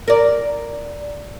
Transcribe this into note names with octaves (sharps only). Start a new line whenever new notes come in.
A#4 D5